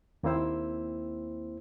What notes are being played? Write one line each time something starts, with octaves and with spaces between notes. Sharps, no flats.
D#2 A#3 C4 E4 C5 E6